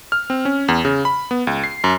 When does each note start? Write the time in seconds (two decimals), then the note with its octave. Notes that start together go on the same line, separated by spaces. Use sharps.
0.12 F6
0.30 C4
0.45 C#4
0.68 E2
0.85 C#3
1.05 B5
1.31 B3
1.47 C#2
1.64 C7
1.84 F#2